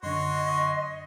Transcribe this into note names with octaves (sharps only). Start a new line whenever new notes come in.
F#2 D3 F#4 C#5 D#5 C6